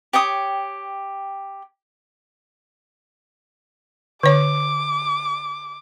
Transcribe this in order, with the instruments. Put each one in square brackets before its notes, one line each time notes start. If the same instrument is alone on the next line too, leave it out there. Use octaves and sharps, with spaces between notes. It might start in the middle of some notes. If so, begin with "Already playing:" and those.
[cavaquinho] G4 C#5 G5 D#6
[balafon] D3 C#5 [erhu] D6